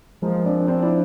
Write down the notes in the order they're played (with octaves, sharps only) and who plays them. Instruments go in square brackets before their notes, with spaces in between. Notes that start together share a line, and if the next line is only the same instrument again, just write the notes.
[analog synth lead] F3 [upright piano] G#3 A#3
[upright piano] C4 D4
C4 D4
D4 E4